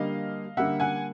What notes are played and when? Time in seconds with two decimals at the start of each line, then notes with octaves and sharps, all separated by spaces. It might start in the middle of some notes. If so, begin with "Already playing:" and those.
Already playing: D3 G3 A#3 D#5 F5
0.57 D3 G3 A#3 E5 F#5
0.80 F#5 G#5